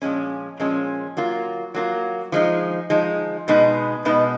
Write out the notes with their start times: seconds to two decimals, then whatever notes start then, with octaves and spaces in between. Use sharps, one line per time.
0.02 A#2 F3 G#3 C#4
0.59 A#2 F3 G#3 C#4
1.17 F#3 A#3 F4
1.75 F#3 A#3 F4
2.32 F3 G#3 D#4
2.90 F3 G#3 D#4
3.48 B2 G#3 B3 D#4
4.05 B2 G#3 B3 D#4